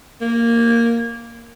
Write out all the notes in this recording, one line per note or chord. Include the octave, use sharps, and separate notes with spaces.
A#3